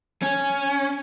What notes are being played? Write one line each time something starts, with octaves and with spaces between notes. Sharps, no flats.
C#4